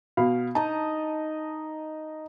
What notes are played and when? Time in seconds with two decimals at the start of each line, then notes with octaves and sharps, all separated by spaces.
0.17 B2 F5 B5
0.55 D#4 D#5 A5